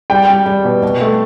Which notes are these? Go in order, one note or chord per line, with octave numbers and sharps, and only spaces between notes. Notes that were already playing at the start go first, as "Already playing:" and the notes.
G3 G5
G3
G3
B2
B2
A3